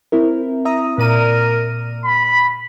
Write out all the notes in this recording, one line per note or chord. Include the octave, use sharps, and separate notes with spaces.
C4 E4 A#4
E5 A#5 D#6
A#2 A#4 D5 D#7
B5